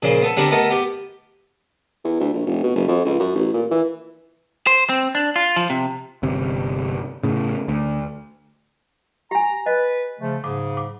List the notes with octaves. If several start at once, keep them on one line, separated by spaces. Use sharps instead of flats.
A#2 C#3 F3
B3 A4
D3 G3 B3 C4 A4 A#4
A3 B3 A4 A#4 D#5
B3 G4
E2
D2
A#1
F1
B2
F#1
F2
C#2
F#2
A1
A#2
E3
C5
C4
D4
F4
F3
C3
G1 C3
A2 C#3
D2
G4 G#5 A#5
B4 D#5
C#3 F3 A3
G#2 C#3 D6
D6